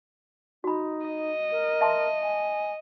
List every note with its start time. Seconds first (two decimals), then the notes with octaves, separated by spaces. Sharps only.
0.64 D#4 F#4 B5
1.07 D#5
1.51 A#4
1.81 E5 A5 C6
2.22 G#5